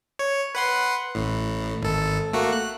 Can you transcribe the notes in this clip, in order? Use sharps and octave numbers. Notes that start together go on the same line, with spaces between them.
C#5
B4 F#5 C6
A1 A2
G#1 A4
A3 A#3 F#4
F#6